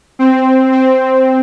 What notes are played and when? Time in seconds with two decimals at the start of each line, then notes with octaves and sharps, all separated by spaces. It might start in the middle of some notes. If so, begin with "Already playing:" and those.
0.19 C4
0.72 C4